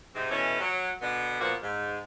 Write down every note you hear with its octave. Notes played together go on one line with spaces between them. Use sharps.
G#2 C3 C4 D#4
B2 E3 A3 C#4
F#3
B2 D3 B3
A#2 F3 A#3 B3 F#4
G#2